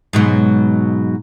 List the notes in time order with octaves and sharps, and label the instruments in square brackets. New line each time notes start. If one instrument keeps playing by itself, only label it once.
[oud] G#2 B2 F#3